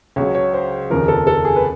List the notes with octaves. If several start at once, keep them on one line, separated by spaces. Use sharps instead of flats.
C#2 C#3 F#3 C#5
C#5
C5
F1 D#2 C#3 F3 A#4
A4
A4
G#4
B4